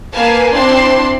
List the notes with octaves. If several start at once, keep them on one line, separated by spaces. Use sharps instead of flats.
A#3 B4 F5 G#5 A5
C4 D4 E4 A5 C6